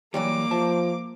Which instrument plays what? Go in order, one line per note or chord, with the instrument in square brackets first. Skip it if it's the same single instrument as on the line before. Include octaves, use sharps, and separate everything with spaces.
[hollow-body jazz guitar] E3 F#3 G3 [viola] A#3 D6
[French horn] F3 [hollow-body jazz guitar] C5 E5 A5